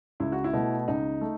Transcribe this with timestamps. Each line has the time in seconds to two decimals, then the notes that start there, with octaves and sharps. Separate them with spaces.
0.20 C#2 E4
0.32 F#4
0.44 E4
0.53 B2 A3
0.88 C#2 D#4
1.21 A3